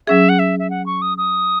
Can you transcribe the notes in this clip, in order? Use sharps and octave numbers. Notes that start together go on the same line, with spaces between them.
F#3 C#4 G#4 E5
F#5
E5
E5
F#5
C#6
D#6
D#6